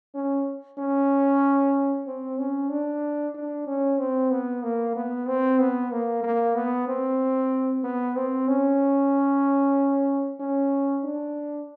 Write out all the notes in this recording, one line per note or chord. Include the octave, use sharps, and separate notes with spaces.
C#4
C#4
C4
C#4
D4
D4
C#4
C4
B3
A#3
B3
C4
B3
A#3
A#3
B3
C4
B3
C4
C#4
C#4
D4